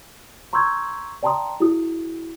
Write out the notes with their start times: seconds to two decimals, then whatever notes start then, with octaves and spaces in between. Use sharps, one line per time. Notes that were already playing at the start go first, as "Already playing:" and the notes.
0.53 A#5 C6 C#6 E6 G6 G#6
1.23 D5 G5 A5 A#5 C6 D#6
1.60 E4 F#4 G#4 D#6